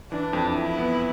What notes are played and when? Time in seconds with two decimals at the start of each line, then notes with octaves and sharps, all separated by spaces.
0.12 E3 D4
0.33 F2
0.55 F2 E4
0.78 B3